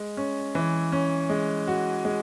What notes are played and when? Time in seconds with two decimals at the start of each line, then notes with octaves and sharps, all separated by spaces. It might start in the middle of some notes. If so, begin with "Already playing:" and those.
Already playing: G#3
0.17 C#4
0.55 E3
0.92 C#4
1.29 G#3
1.67 F#4
2.05 G#3